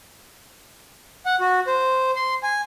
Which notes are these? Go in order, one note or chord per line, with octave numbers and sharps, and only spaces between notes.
F#5
F#4
C5
C6
G#5